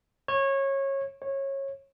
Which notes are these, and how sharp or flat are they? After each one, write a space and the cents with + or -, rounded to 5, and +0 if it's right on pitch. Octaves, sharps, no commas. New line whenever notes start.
C#5 -20
C#5 -20